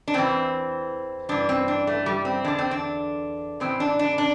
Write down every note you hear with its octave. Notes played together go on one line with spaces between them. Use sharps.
D4
E2 E3 C4
G2 E3 D4
C4
D4
A3
G3
C4
E2 D3 D4
C4
D4
A2 E3 C4
D4
D4
D4